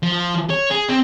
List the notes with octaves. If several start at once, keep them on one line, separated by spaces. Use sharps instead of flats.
F3
C#5
G#4
C4